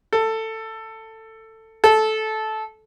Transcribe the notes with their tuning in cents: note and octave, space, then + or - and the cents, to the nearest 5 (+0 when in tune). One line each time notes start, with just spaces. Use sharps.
A4 +15
A4 -15